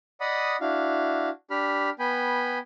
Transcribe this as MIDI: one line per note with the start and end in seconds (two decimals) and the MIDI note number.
0.21 0.56 74
0.21 0.56 75
0.21 0.56 78
0.21 0.56 83
0.21 0.56 87
0.61 1.29 62
0.61 1.29 64
0.61 1.29 66
0.61 1.29 77
1.51 1.90 62
1.51 1.90 67
1.51 1.90 83
1.51 1.90 89
1.99 2.58 59
1.99 2.58 79
1.99 2.58 80
1.99 2.58 83